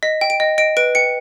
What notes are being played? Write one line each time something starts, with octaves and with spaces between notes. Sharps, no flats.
D#5 B6
G5
D7
D#5
D#5 D7
B4 D7
G5 C#7